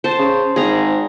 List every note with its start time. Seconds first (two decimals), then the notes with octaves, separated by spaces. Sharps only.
0.04 C5 A5
0.19 C#3
0.56 G#1 G#4 A#5